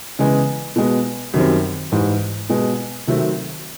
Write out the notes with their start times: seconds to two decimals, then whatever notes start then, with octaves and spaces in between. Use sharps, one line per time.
0.19 C#3 E3 G#3 B3
0.76 B2 G#3 B3
1.34 F#2 D#3 G3 C4
1.92 G#2 E3 G3
2.49 B2 G#3 B3
3.07 C3 D#3 F#3 A3 C4